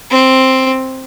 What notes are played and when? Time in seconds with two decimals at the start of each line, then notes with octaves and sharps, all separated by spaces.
0.11 C4